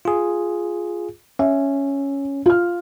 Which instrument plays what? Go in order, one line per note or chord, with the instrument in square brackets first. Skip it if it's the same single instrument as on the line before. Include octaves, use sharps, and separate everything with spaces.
[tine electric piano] F4 G#4
[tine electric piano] C#4 [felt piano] E5
[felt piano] F4 F6